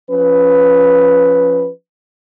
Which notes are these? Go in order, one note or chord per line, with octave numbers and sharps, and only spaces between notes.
F3 C#4 B4